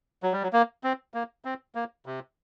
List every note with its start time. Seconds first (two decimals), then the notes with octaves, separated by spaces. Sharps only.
0.23 F#3
0.33 G3
0.43 F#3
0.53 A#3
0.84 C4
1.14 A#3
1.45 C4
1.75 A#3
2.06 C3